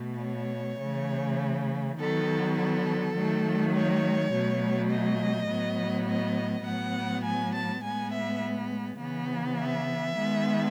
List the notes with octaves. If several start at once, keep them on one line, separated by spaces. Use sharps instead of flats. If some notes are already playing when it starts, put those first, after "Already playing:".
Already playing: B2 A3
C#5
C#3 E3 A3
D#3 F#3 B3 A4
A4
D#3 F#3 A3
C#5
B2 F#3 A3
D#5
A2 F#3 B3
D#5
A2 F#3 B3 F#5
G#5
A5
A2 G#3 B3 G#5
E5
C#3 E3 B3
E5
D#3 G#3 B3